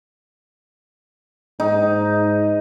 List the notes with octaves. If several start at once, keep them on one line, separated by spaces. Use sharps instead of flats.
G#2 D#4